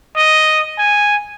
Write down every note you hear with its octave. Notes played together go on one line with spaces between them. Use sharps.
D#5
G#5